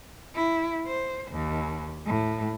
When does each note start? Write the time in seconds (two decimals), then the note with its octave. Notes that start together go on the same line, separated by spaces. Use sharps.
0.35 E4
0.87 C5
1.32 D#2
2.06 A2